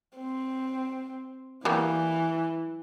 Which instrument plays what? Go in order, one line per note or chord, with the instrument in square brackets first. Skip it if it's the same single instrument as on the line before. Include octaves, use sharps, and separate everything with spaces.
[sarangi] C4
[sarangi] E3 [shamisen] F#3 G3 A#3